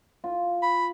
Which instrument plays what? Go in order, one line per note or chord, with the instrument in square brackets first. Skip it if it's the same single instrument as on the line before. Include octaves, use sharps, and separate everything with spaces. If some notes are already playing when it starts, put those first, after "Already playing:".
[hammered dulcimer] F4
[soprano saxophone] B5